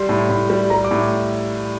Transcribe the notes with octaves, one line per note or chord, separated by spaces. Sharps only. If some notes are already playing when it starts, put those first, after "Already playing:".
Already playing: G3 C6
A2
A2
G3
G3 A#5
D6
A2